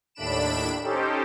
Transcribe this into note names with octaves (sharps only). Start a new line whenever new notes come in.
D#2 A2 D4 B5 D7 E7
C#4 D#4 G4 A4 C5